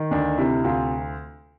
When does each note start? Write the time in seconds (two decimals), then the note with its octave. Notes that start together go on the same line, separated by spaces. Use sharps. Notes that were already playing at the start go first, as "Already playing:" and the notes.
Already playing: D#3
0.11 D2 D4
0.38 C3 E4
0.64 D2 F4